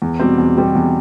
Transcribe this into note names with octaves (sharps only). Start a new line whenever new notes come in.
E2
B2 G3 C4
E2
B2 G3 C4
E2